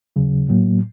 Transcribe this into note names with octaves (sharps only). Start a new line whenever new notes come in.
D#2 C#3 F#3
A2 F#3 A#3